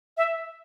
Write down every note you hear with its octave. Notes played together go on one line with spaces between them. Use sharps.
E5